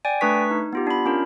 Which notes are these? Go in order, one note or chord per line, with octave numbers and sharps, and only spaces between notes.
D5 G5 G#5
A3 D4 B4 C#6 B6
D#4
B3 F4 G4
D4 B5
C#4 D4 F4 A#4